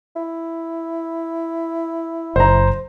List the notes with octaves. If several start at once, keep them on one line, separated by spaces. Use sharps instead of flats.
E4
F#1 C5 A#5